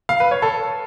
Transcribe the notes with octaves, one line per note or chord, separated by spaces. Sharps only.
F5
B4
C#5
A4